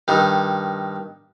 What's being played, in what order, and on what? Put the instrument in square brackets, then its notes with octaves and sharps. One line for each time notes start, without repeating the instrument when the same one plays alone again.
[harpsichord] G2 D#3